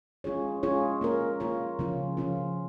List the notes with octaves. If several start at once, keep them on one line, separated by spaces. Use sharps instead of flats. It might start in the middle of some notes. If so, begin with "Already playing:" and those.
G#3 C#4 F4 G#4 C#5
G#3 C#4 F4 G#4 C#5
A#3 F4 A#4 C#5
A#3 F4 A#4 C#5
C#3 F3 C#4 F4
C#3 F3 C#4 F4